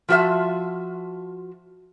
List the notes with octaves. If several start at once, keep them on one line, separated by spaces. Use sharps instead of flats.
F3 F4 F#4 A#4 E5 A5